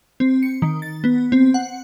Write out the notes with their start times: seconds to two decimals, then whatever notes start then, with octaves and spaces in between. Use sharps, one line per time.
0.20 C4
0.43 C#7
0.62 D#3
0.82 A6
1.04 B3
1.32 C4
1.54 F#5